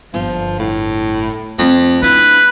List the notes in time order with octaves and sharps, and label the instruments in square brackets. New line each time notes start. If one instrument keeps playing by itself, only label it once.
[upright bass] G1 [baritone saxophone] F3
[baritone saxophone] A2
[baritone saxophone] F2 [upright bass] A3 C4
[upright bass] D4 [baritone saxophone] E4 [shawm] B4